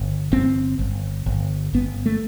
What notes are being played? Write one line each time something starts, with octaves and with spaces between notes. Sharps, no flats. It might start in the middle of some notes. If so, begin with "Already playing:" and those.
Already playing: G1
G1 C4
G1
G1
G1 B3
A3